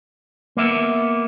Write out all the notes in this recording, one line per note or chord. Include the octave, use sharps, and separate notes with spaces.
A#3 B3 E5